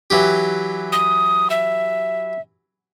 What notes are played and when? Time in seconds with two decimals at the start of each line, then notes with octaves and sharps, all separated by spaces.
0.10 E3 F#3 G4
0.92 D#6
1.50 E5